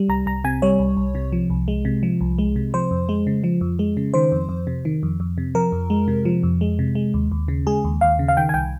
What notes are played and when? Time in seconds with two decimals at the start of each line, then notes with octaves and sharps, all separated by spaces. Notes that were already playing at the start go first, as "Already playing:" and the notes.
Already playing: G3
0.09 C2 A#5
0.26 C2 A#5
0.44 C3 G#5
0.62 G3 C#5
0.79 C2
0.97 C2
1.15 C3
1.32 F3
1.50 C2
1.68 G#3
1.85 C3
2.03 F3
2.21 C2
2.38 G#3
2.56 C3
2.74 F3 C5
2.91 F2
3.09 G#3
3.27 C#3
3.44 F3
3.61 F2
3.79 G#3
3.97 C#3
4.14 D#3 C5
4.32 F2
4.49 F2
4.67 C3
4.85 D#3
5.03 F2
5.20 F2
5.38 C3
5.55 F3 A#4
5.72 F2
5.90 G#3
6.08 C3
6.25 F3
6.43 F2
6.61 G#3
6.79 C3
6.95 G#3
7.14 D#2
7.32 D#2
7.48 C#3
7.67 G#3 G#4
7.85 D#2
8.01 D#2 F5
8.19 C#3
8.28 F5
8.37 D#3 G5
8.49 G#5
8.54 C2 G5